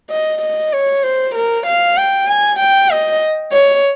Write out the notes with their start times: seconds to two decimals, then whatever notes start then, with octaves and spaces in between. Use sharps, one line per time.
0.10 D#5
0.42 D#5
0.73 C#5
1.03 C5
1.35 A#4
1.66 F5
1.97 G5
2.27 G#5
2.59 G5
2.90 D#5
3.52 C#5